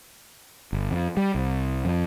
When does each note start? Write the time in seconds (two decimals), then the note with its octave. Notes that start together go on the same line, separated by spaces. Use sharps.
0.73 G1
0.90 F2
1.17 G3
1.35 C2
1.85 F2